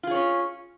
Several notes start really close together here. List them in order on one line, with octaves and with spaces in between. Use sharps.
F4 G#4 C#5 C#4